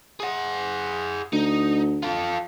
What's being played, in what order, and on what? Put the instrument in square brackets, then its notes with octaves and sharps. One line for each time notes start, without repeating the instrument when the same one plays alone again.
[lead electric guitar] G#4 F#5
[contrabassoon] D2 [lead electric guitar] D#4
[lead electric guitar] F4 A4